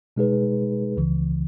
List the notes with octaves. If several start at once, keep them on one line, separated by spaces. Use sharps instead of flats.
B2 G#3 D#4 G#4 B4
C#2 C#3 E3